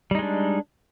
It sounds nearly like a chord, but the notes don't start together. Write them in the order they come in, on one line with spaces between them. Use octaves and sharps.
G3 D#4 G#3 D4